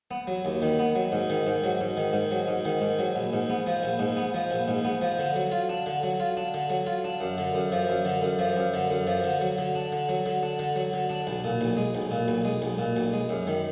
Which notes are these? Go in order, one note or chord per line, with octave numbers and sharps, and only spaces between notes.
B3
F#3
D#2
D#3
B3
F#3
G#2
D#3
G#2
F#3
G#2
D#3
G#2
F#3
G#2
D#3
G#2
F#3
A#1
G#2
B3
F3
A#1
G#2
B3
F3
A#1
G#2
B3
F3
D3
F#3
F4
D4
D3
F#3
F4
D4
D3
F#3
F4
D4
F#2
D3
F#2
F3
F#2
D3
F#2
F3
F#2
D3
F#2
F3
D3
F#3
D3
D4
D3
F#3
D3
D4
D3
F#3
D3
D4
B1
A#2
B1
G#3
B1
A#2
B1
G#3
B1
A#2
B1
G#3
F#2
D#3